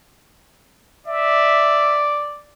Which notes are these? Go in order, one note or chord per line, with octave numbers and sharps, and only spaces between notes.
D5 E5